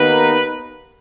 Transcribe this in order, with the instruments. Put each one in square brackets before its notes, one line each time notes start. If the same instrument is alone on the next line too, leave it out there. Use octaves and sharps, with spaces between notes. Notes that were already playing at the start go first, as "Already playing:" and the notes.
Already playing: [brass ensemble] D#2 D#3 B3 D#4 [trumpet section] B4